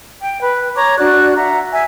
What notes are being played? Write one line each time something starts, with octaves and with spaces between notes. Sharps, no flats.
G5
B4
C#5 A#5 C#6 D6
D4 F#4 D5 F#6
E5 F#5 A#5
E5 G#5